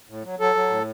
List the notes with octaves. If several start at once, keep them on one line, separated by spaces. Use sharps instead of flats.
A2
F#3
F#3 A4
F#3
A2